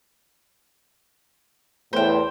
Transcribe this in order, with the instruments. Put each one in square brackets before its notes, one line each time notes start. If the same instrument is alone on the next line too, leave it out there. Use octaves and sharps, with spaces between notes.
[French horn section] E2 A2 [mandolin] C5 G5